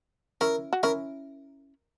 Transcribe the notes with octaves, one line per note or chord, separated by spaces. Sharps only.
C#4 E4 A#4
F#4
C#4 E4 A#4